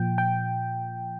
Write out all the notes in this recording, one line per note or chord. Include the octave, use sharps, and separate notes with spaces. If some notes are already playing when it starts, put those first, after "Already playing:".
Already playing: A#2 F3 G5
G5